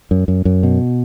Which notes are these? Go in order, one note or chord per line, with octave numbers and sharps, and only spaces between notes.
F#2
F#2
F#2
B2